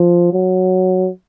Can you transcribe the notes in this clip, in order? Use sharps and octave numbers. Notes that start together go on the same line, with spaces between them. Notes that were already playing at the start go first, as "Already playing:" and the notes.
Already playing: F3
F#3